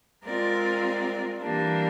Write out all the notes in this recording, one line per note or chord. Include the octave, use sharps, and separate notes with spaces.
G#3 C4 F4 A#4 D5
E3 G3 A#3 D4